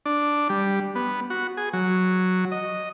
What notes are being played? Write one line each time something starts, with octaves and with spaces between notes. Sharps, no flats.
D4
G3
B3
F#4
G#4
F#3
D#5